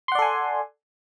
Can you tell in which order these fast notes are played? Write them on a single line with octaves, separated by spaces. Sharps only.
C6 F#5 D5 A4 G#5